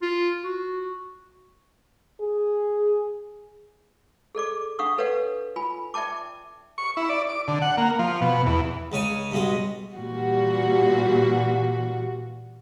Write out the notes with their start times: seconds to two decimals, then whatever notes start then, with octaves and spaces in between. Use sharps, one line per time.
0.02 F4
0.44 F#4
2.21 G#4
4.35 G#4 A4 D5 D6
4.79 D4 F5 F#5 C#6 D#6
4.98 A4 B4 C#5 D5 F5 F#5
5.56 F4 G#5 B5
5.94 D5 E5 G5 A5 D6
6.78 C#6
6.97 E4
7.09 D5
7.29 D6
7.48 D3
7.62 F#5
7.78 A#3
7.99 F3
8.21 B2
8.46 E2
8.92 C#2 C#3 C#5 G#5
9.31 G2 B2 G#3
9.95 A#2 E3 G3 F#4